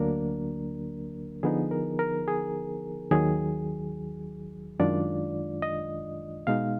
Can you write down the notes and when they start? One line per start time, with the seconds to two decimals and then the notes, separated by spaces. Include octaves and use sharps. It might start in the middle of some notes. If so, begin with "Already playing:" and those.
Already playing: D2 D3 F#3 A#3 D4 A#4
1.43 D3 F3 B3 D#4 G#4
1.71 A#4
1.99 A#4
2.28 G#4
3.11 D#2 D#3 F#3 G#4
4.79 F#2 D#3 G#3 D4 F4 D5
5.62 D#5
6.47 B2 G#3 D#4 F5